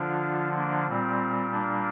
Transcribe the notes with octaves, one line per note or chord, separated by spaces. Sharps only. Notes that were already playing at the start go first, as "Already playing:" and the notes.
Already playing: D3 F3 D4 F4
A#3 D4
A#2 G3 C4
A#3 D4